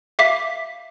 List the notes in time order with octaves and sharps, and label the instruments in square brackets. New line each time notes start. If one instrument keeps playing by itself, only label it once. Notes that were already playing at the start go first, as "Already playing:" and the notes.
[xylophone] E5 F5 D6 B6